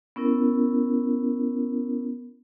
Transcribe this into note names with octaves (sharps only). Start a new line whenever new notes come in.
B3 C#4 E4 A#4